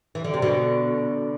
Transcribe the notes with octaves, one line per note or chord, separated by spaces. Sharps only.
E3
D3
C3
B2 D3